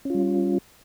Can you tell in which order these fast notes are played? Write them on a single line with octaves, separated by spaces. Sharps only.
C#4 F4 G3